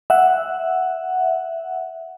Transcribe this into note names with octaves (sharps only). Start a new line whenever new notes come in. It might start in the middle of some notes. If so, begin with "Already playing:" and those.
E5 F#5